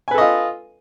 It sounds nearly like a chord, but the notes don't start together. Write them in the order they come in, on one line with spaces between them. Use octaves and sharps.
G#5 B4 A4 D#5 F4